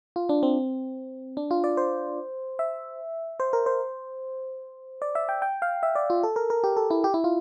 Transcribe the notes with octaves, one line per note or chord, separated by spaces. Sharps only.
F4
D4
C4
D4
F4
D5
C5
E5
C5
A#4
C5
D5
E5
G5
G5
F5
E5
D5
F4
A4
A#4
A#4
G4
A4
E4
G4
E4
F4